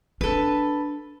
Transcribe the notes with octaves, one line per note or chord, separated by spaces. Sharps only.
D4 A4 B4